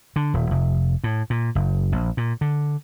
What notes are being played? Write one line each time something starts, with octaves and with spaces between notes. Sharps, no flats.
D3
D#1
F1
A2
A#2
F#1
A#1
A#2
D3